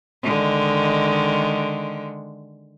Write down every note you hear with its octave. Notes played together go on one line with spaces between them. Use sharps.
D3 D#3 G#3